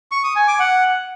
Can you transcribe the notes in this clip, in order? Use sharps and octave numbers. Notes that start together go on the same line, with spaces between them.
C#6
D#6
G#5
D6
F#5